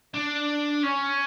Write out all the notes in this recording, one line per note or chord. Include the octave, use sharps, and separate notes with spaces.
D4
C#4